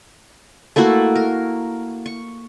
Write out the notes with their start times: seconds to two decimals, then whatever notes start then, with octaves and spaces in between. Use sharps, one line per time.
0.76 A3 A#3 E4 F#4
1.16 A#4
2.06 C#6